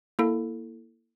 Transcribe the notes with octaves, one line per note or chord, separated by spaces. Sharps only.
A#3 E4 A4